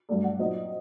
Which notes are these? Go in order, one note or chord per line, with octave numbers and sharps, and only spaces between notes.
G2 F#3 A3 D5
F#5
A#2 F#3 C4 D#4 D#5